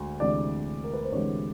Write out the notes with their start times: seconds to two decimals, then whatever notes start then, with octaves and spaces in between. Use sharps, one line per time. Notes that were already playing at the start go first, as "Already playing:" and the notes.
Already playing: D2 G#3
0.20 D2 C3 E3 G#3 D5
0.84 A#4
0.93 B4
1.03 C5
1.12 D2 C3 E3 G#3 C#5